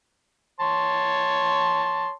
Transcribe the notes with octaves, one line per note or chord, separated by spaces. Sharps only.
C#5 A5 C6